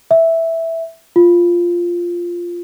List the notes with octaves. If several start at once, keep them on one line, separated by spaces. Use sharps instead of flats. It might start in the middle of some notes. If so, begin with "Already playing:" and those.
E5
F4